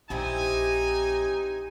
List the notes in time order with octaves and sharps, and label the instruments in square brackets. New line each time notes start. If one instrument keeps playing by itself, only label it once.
[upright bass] A#1 F3 [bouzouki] C4 E4 G4 [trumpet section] D#4 G#5